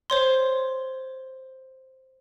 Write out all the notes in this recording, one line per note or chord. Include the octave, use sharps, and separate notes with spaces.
C5 C#5 C6